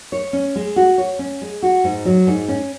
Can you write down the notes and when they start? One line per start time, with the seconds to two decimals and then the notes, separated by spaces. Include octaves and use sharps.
0.12 C#5
0.33 C#4
0.55 G#3
0.76 F#4
0.98 C#5
1.19 C#4
1.41 G#3
1.62 F#4
1.84 G#2
2.05 F#3
2.27 G#2
2.48 C#4